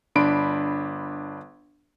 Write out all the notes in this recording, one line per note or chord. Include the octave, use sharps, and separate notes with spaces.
G1 D4 B5 C6 D7